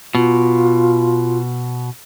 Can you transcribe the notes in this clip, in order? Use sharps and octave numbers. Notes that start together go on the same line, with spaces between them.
B2 F4